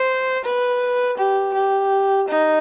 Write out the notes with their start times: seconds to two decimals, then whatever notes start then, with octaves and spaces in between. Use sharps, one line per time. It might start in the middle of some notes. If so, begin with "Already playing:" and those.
Already playing: C5
0.45 B4
1.18 G4
1.54 G4
2.29 D#4